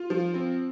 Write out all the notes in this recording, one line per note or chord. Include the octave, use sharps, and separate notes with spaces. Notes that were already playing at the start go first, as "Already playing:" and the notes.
Already playing: F4
F3
C4